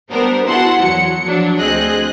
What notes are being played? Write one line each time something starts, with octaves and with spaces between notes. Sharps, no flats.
G3 B3 D4 A#4 C5
E4 F#4 G#4 F#5 A5 C6
E2 F#3 C#7
F3 F#3 D4
D2 C4 G#4 D#5 F#6